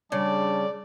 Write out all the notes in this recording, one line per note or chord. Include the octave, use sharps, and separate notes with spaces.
C#3 G3 D4 D5 A5